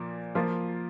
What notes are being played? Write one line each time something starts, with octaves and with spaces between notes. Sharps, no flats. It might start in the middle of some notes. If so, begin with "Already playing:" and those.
Already playing: A#2 F3 A#3
F3 A#3 F4